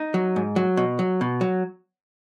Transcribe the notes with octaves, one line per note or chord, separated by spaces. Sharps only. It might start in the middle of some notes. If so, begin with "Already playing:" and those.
Already playing: D#4
F#3
G#2
F#3
B2
F#3
B2
F#3